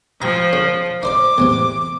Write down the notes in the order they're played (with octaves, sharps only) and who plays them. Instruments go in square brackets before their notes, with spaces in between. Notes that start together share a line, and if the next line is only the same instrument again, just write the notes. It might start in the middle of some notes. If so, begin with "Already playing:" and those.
[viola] F3 [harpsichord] G5 A#5
[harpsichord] C#3
[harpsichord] D#4 C5 D5 [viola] D6
[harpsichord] E2 A2 C3